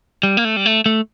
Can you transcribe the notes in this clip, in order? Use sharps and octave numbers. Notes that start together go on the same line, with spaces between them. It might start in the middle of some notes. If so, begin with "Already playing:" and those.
G3
A#3
A3
G3
A3
A3